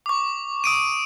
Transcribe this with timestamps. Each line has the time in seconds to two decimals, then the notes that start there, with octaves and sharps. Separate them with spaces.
0.06 C#6 D6
0.64 D#6 D7 D#7